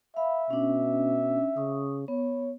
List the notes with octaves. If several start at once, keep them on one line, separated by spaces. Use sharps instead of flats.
E5 F5 B5
B2 C#4 D4
C#3 C#6 D#6
B3 C#5